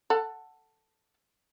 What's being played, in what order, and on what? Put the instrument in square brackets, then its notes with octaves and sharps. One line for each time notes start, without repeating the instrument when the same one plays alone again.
[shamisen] A4 F#5